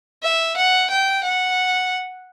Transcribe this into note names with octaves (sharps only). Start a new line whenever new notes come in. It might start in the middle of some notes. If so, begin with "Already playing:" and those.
E5
F#5
G5
F#5